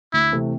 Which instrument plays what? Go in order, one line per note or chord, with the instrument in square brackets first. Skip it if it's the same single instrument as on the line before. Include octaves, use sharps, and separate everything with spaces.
[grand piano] D2 [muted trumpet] E4
[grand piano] C3 E3 A3 C4